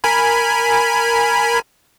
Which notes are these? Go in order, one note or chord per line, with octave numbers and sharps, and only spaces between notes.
A#4 G#5 B5